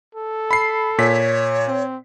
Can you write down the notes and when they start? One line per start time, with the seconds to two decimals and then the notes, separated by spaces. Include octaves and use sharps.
0.15 A4
0.51 B5 C7
0.98 A#2 C#5 B6
1.68 C4